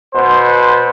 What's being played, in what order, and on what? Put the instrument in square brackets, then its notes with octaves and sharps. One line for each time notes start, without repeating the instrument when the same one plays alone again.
[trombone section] B2 C5